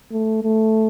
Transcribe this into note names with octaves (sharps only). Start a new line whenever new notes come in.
A3
A3